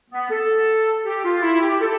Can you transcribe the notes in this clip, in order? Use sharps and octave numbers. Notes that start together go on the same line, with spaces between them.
B3
A4
G4
F4
E4
G4
A4